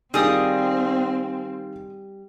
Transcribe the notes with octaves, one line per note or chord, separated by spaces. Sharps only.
D#3 G3 C4 D#4 F4 G#4 D#6